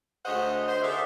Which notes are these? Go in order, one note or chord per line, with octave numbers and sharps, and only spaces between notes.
D2 G#4 C5 C#5 D#5 F#5
C5
D3 G#4 A#4 D5 E5